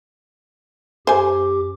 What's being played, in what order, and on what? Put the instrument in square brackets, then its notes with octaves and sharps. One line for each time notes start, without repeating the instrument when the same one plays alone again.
[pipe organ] F#2 G4 D6 [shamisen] C5 G#5